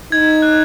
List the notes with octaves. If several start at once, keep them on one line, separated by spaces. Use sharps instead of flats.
D#4 G#6
F#6